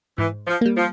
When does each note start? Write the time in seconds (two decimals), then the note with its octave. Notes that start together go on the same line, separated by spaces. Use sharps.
0.18 G#2 E3
0.47 F3
0.61 G3 A#3
0.77 F3